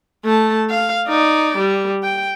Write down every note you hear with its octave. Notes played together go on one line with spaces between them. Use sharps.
A3 A5
F5
D#4 D5
G3
G5